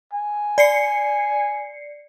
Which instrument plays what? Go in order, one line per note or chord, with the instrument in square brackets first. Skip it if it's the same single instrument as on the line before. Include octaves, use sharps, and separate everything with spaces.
[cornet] G#5
[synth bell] D5 C7 C#7